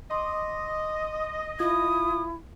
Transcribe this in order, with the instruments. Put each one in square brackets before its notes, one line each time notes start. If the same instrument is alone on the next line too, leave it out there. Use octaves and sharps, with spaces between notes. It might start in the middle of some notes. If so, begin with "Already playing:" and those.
[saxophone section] D#5 [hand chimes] C6 D6
[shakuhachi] E4 [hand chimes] F4 G#6 [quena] D#6